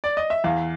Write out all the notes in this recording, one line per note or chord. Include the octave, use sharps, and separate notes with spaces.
D5
D#5
E5
E2 F5